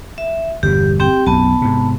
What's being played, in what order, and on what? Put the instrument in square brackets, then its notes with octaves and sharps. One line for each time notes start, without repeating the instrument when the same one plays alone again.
[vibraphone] E5
[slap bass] G1 E2 B2 [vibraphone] G4
[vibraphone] C4 G4 G5
[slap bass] B1 F#2 [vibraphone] B3 A5
[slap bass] G#2 C3